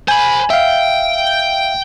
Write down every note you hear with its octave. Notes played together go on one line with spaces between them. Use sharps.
C5 G#5 B5
E5 F5 G5